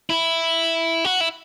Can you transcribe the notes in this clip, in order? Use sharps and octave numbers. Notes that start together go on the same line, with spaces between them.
E4
F#4
E4